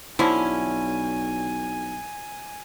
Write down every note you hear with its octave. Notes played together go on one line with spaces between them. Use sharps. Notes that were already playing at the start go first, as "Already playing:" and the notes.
B1 D3 F3 C#4 E4 G#5